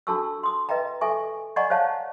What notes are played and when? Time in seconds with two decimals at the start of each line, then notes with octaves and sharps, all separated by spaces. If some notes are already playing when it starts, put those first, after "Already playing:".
0.07 D4 F#4 A4 A5 C#6 E6
0.43 C6 D#6
0.69 B4 D#5 E5 G5 A#5
1.01 A4 E5 G#5 C#6
1.56 D5 D#5 F#5 G#5 A#5 C#6
1.70 C5 C#5 F5 A5